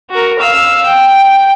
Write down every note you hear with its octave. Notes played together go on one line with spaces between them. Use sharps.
F#4 A#4
F5 E6
G5